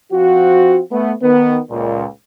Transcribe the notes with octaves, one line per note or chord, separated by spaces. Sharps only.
F3 C4 F4 F#4
A3 B3
D#3 B3
C#2 A#2